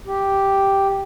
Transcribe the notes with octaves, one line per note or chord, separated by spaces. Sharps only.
G4